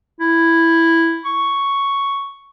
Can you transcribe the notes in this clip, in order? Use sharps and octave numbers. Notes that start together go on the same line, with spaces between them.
E4
C#6